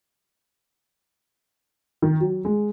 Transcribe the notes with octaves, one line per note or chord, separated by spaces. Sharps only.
D#3
F#3
G#3